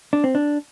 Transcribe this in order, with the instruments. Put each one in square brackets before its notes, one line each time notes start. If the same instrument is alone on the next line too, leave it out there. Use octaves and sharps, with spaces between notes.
[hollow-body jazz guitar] D4
C4
D4